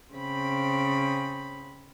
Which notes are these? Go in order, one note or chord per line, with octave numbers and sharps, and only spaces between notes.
C#3 C4 B5